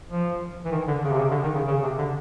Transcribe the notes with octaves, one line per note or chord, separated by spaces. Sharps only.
F3
E3
D#3
D3
C#3
C3
C#3
D3
D#3
C#3
C#3
C3
D3